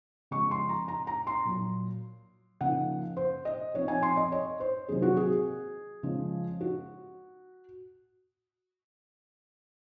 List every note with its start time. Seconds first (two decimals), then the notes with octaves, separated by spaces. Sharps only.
0.31 C#3 F3 G#3 C#6
0.51 C6
0.69 A#5
0.88 A#5
1.07 A#5
1.27 C6
1.45 A#2 F#3 A#3
2.61 C#3 F3 A#3 D#4 F#5
3.17 C5
3.45 D#5
3.74 F3 C4 D#4 C#5
3.88 G#5
4.03 C6
4.17 D#5
4.32 C#5
4.60 C5
4.89 C3 D#3 F#3 A#3 D#4 G#4
5.02 F#4
5.17 G#4
6.03 C#3 F3 G#3 C#4
6.61 F#4